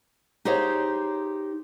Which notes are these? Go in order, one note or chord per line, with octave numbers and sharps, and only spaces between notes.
D#4 G4 G#4 C5 C#5 F5